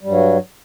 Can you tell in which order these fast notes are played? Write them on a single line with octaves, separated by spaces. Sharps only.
G3 G2 F#3